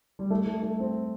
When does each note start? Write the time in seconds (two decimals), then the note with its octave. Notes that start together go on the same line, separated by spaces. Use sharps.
0.19 G3
0.30 A3
0.46 A3
0.63 A3
0.80 C4